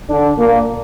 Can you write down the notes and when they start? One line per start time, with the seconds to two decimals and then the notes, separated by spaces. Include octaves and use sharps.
0.10 D3 D4
0.38 A#2 A#3